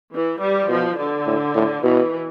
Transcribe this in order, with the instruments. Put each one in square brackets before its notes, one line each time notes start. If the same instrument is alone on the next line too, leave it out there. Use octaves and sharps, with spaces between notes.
[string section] E3
G3
[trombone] B2 [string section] F3
[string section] D3
[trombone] A2
A2
[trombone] B2 [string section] E3